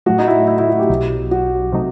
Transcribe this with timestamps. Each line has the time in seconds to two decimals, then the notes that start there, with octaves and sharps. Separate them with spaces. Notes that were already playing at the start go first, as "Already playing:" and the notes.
0.06 A2 F#3 A3 F#4
0.18 D#4
0.28 E4
0.48 E4
0.59 E4
0.69 F#4
0.79 G4
0.90 B1 B2 F#3
1.31 F#4
1.72 C3 F#3 A3 D#4